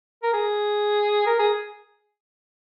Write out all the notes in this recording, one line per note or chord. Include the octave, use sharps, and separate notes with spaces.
A#4
G#4
A#4
G#4